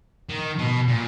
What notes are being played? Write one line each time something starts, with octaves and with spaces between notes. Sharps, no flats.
D#3
B2
A#2